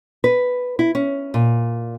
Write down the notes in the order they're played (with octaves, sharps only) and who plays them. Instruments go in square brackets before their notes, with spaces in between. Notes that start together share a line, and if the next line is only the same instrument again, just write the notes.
[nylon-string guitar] B4
E4
C#4
A#2